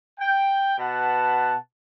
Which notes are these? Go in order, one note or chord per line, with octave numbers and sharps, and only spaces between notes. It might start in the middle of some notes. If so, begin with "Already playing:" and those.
G5
B2 B4 F#5 A5